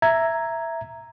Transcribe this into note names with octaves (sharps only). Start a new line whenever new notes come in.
E5 A#5 G#6